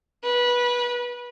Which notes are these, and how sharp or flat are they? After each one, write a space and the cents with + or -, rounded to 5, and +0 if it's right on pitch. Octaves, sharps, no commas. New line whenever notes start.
B4 -20